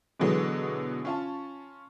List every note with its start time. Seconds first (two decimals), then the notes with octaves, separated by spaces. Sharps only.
0.19 B2 D3 E3 F#3 G#3 B3
1.05 C#4 F4 A5